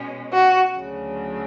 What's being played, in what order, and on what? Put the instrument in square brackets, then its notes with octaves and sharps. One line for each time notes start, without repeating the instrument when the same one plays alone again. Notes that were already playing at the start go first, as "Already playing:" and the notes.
Already playing: [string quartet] B2 G#3 C#4
[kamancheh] F#4
[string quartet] D2 C#3 F#3